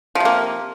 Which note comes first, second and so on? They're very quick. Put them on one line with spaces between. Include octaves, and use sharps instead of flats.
F3 C3 A#3